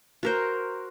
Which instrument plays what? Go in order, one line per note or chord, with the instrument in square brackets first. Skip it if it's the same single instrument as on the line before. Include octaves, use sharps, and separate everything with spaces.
[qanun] F#4 A#4 C5